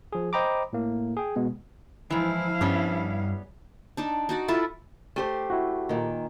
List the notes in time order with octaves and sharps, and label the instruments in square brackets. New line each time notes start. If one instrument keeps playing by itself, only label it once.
[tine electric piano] F3 G#4
C5 D#5 G5 A#5 B5 D6
A2 A#3
G#4 G5
B2 G#3 B3
[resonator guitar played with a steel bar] G#2 E3 [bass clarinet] F3 [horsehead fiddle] E4 F5
[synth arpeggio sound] G2 [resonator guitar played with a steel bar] G3 B3 C#4
[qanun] D4 D#4 D5
D#4 F#4 D5
E4 F4 A4 B4
[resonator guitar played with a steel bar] A3 G4 C5
[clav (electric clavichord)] E4 F#4
[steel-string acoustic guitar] A#2 D#3